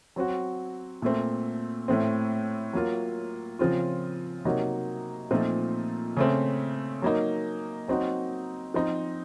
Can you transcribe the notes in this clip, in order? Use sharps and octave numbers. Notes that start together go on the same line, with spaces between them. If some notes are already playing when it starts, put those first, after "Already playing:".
F#3 C4 F#4
A#2 A3 C4
A2 A3 C4
F#3 A#3 F4
C#3 F3 C4 F4
C3 F#3 A#3 D#4 F#4
A#2 F3 A3 C4 D#4
C#3 A3 C4
F#3 A#3 D#4
F#3 C4 D#4 F#4
F3 C4 D#4